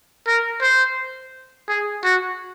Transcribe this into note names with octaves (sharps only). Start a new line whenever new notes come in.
A#4
C5
G#4
F#4